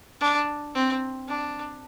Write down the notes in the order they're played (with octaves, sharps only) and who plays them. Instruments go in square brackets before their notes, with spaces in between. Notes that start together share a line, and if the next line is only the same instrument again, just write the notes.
[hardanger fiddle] D4
C4
D4